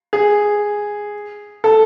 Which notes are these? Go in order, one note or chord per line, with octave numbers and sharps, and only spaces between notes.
G#4
A4